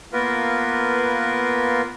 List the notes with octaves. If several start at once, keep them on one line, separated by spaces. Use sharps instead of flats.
A#3 B3 F4 A#4 B4